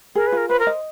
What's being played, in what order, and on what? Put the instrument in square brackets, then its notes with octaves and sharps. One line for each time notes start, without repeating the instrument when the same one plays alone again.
[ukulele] G#4 [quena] A#4
[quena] B4
[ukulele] F4 [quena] A#4
[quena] B4 [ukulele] C5
[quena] A#4
[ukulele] D#5